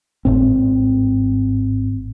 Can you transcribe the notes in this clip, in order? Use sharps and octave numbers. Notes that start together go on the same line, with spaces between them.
G#1 A2 C4